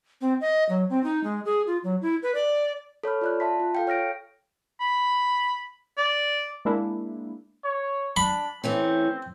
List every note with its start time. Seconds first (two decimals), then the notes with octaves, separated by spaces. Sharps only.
0.21 C4
0.41 D#5
0.69 F#3
0.90 C4
1.04 D#4
1.24 G#3
1.45 G#4
1.67 F4
1.84 F#3
2.02 E4
2.23 B4
2.35 D5
3.03 A4 C#5 B5 F6
3.21 F4 D5 F#6
3.40 E5 A5 C6 B6
3.60 F4
3.75 A4 F5 G5
3.87 C#5 F6 A#6 D7
4.81 B5
5.98 D5
6.65 G#3 A#3 D4 E4
7.64 C#5
8.17 D4 B5
8.64 E3 A3 C4 C#4